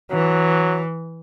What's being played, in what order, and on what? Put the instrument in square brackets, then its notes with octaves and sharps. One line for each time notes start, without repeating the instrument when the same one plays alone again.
[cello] E3 [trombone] F#3